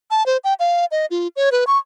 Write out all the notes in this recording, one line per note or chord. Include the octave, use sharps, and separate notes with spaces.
A5
C5
G5
F5
D#5
F4
C#5
B4
C#6